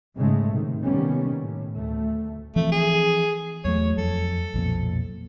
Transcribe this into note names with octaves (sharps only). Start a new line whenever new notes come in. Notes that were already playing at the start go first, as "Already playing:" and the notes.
G#2 C#3 G#3 A3
A2 C3 D#3
C3 D#3 G3 A#3 B3 C#4
A2
D2 A3
E3 F3 A3 C4
G#4
E2 F#3 A3 C#5
F2 A4
B1 F2 A#2